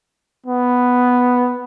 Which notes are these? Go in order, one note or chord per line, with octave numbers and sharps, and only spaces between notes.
B3